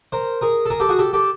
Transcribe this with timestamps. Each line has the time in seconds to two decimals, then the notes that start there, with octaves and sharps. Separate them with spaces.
0.12 A#4 C5
0.41 G#4 A#4
0.66 A4
0.70 G#4 A#4
0.80 G4 A4
0.89 F#4 G#4
0.99 G4 A4
1.13 G4 A4